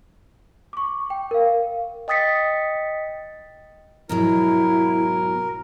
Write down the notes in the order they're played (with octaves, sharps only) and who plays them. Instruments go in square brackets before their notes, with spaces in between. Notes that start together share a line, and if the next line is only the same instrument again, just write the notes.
[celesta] C#6 D6
G5
A#4 F5
[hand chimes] D#5 G5 D#6 A6 B6 C#7
[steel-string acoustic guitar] G#2 B2 F#3 [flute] E4 [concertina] A#4